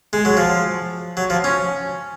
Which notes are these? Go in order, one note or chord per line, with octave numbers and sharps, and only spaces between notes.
G#3
F#3
F3
F#3
F3
C#4